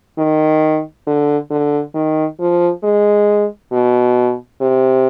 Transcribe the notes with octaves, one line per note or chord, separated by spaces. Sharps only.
D#3
D3
D3
D#3
F3
G#3
B2
C3